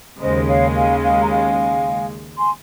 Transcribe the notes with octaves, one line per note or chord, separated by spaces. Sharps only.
D#2 C#3 G#3 C5 D#5
C#5 F5
F5 G#5
F5 G#5
A#5
F5 G#5
G#5 C6